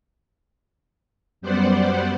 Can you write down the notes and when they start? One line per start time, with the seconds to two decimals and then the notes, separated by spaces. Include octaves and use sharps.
1.41 F#2 G3 B3 C5 D5 F#5